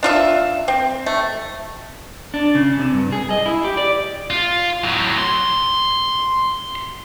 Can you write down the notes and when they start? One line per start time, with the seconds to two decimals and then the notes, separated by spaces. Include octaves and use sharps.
0.03 D4 F4 E5
0.68 C4
1.06 A3
2.34 D4
2.55 C#3
2.79 C3
2.94 G2
3.12 G#4
3.30 D#5
3.46 E4
3.64 G4
3.77 D5
4.30 F4
4.84 A2 F#3
5.18 C6